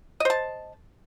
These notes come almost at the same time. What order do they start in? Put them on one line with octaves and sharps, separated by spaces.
D#5 C5 A5